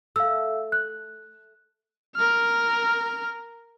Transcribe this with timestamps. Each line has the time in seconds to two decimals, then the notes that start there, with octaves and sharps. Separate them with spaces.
0.16 A3 F5 E6
0.72 F#6
2.15 A#4 F6